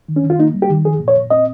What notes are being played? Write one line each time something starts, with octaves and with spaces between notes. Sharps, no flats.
D#3
C#4
D#3
F4
A#3 D#4
G3
G4
D#3
F3 G#4
A#2
C#5
A#2
C4 D#5